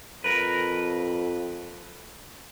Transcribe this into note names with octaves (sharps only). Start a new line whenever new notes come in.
F2 A#4 B4